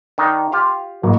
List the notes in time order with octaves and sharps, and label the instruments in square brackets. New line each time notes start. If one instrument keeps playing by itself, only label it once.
[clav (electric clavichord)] D#3 D4 D#4
F4 G4 F5
[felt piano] A1 F#3 A#3